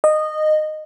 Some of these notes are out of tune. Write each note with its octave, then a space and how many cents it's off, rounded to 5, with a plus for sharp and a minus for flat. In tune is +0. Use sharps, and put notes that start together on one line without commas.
D#5 -15